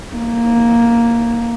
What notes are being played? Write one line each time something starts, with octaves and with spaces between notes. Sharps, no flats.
A#3